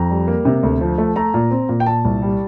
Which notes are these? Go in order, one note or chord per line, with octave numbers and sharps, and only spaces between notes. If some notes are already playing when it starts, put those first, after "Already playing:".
Already playing: F2 A#5
G3
A#3
C3
D2
F3
A3
A3 A#5
A#2
C4
A#2
G5
A#2 A5
C2
G3